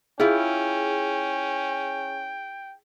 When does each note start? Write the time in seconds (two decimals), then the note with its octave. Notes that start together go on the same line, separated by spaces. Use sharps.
0.20 C#4 E4 F4 G#4 G5